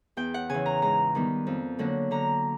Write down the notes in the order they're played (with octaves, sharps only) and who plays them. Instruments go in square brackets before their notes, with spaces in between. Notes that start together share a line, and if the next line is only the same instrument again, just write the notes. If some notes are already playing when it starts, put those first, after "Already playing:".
[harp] E2 G5
F#5
C#3 E3 G#5
A#5
G#2 A#5
D#3 G3 B3
F2
D3 F#3 A#3 D4
D3 A#5